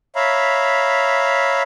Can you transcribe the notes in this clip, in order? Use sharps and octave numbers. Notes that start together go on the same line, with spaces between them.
C#5 E5 F5 A#5 B5